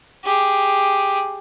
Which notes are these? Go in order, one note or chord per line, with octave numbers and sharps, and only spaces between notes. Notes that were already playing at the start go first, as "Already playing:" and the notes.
G4 G#4